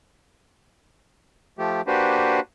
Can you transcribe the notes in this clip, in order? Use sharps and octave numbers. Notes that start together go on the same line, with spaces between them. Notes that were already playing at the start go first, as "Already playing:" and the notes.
F3 A3 G4
A#3 D4 F#4 G4 B4 C5